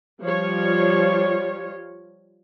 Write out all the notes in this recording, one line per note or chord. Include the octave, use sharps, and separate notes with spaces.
F3 G3 F4 C#5